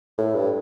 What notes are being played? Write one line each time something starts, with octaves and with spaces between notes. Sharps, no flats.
A2
G2